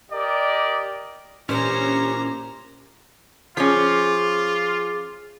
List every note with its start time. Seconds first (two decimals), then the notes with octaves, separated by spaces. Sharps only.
0.11 G4 A#4 D5 D#5
1.49 A#2 E3 C#4 D4 G4 C5 A#5
3.57 F3 C#4 F4 G#4 D6